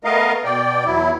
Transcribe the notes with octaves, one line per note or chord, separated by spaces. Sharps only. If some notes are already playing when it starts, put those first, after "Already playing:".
A3 B3 A#4 D#5 F5
B2 D5 G5
E2 F#3 E4